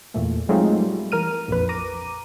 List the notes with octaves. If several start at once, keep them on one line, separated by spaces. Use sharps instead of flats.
E2 A#2 A3
F#3 G#3 A3 C4 D#4 F4
G3
E3 A#4 F6 D#7
A#1 F2 B4
A#5 D6 D#7